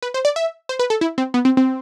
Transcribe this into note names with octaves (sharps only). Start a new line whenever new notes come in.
B4
C5
D5
E5
C5
B4
A4
E4
C4
B3
C4
C4